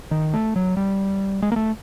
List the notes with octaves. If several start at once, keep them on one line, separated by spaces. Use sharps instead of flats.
D#3
A3
F#3
G3
G#3
A#3
A3